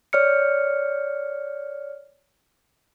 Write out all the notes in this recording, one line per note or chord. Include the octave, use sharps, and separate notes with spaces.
C#5 D5 F6 C#7